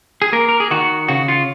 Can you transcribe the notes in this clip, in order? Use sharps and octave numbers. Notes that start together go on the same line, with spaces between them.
G#4
A#3 A#4
A#4
G#4
D#3 F#4
C#3 F#4
F4